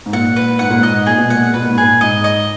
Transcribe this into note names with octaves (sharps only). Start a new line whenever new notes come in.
G#2
A#2 F#5
B4
G#2 F#5
A#2
G#2 D#5
A#2 G#4
B2
A#2 F#5
B2 B4
A#2
G#2
A#2 G#4
G#2 D#5
D#5